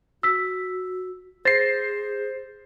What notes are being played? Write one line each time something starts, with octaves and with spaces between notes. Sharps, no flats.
F#4 E6 B6
G#4 C5 A6 A#6 C7